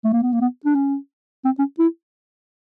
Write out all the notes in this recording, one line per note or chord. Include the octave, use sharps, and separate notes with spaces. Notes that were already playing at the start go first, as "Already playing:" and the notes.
A3
A#3
B3
A#3
B3
D4
C#4
C4
C#4
E4